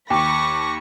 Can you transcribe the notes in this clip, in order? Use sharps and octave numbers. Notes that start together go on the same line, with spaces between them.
D#2 G5 B5 C#6 D6 A#6